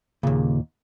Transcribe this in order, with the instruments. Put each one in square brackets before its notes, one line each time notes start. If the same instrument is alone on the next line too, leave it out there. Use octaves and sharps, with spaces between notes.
[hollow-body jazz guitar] D#2 A#2 [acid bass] C#3